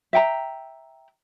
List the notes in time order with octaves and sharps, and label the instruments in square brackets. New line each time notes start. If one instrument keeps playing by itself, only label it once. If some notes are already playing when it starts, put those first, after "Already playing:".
[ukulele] E5 G5 A#5